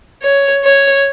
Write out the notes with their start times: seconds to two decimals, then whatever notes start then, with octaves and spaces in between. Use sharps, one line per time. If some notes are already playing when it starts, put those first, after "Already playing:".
0.22 C#5
0.64 C#5